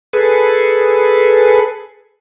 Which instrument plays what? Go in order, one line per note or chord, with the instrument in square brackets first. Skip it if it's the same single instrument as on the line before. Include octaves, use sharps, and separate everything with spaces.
[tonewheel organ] G#4 A4 B4